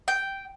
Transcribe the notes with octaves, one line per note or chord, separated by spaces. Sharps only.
G5